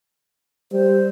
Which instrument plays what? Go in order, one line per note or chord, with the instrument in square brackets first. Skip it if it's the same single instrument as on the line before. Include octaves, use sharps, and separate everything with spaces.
[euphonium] G3 [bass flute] C5